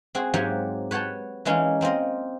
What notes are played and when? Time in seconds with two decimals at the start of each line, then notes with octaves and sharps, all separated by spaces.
0.15 C4 F#4 G#4
0.34 G#2 F#3 A#3 G4 F#5 G#5
0.91 B4 C#5 F#5 G5 A5
1.45 E3 G#3 A#3 C#4 D#4
1.81 A#3 C4 F4 D#5